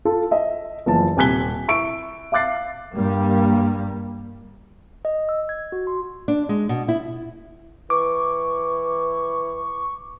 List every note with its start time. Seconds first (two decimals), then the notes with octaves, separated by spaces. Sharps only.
0.05 F4 A4 A5
0.31 D#5 E5
0.86 F#1 E3 F3 B3 A5
1.17 D#1 C3 G#5 F#6 B6 G7
1.68 E4 C#6 E6 D7
2.32 E5 F5 D6 F#6 A6 C7
2.95 G2 G3 A#3
5.05 D#5
5.29 E6
5.49 G#6
5.72 F#4
5.87 C6
6.28 D4
6.49 G#3
6.69 B2
6.88 E4
7.90 E3 C#6 D6